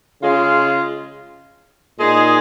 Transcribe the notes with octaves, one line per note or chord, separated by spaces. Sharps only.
C#3 G#3 F4
A#2 G#3 D#4 G#4